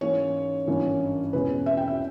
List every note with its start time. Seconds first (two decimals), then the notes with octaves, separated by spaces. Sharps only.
0.01 G#2 E3 A#3 C#4 C#5
0.67 G#1 G2 E3 A#3 C#4
1.33 E2 B2 G#3 C#4 B4
1.66 E5
1.77 G5
1.88 E5